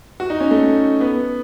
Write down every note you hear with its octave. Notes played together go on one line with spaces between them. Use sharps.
F#4
D#4
C#4
A3
B3